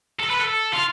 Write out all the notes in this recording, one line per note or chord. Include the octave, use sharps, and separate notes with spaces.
A4
B4
A4
F4